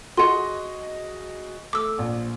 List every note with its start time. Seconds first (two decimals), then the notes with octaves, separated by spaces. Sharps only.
0.17 F#4 G#4 D#5 F#5 C6
1.73 A3 D6 E6
1.99 A#1